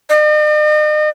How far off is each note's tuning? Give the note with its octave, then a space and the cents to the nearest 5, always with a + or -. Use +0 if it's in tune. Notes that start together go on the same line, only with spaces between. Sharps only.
D#5 -45